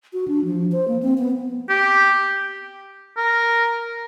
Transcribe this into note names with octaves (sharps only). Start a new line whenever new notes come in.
F#4
D4
F3
C5
A#3
C4
B3
G4
A#4